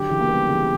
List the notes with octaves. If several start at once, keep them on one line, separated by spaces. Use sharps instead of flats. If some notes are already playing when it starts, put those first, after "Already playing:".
Already playing: D3 F#3 G4
C#3 E3
A#3
G3 B3
C#3 E3